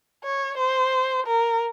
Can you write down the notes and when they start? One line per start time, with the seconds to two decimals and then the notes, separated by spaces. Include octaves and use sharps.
0.24 C#5
0.58 C5
1.27 A#4